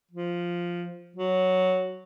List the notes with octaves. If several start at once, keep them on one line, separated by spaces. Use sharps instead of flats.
F3
F#3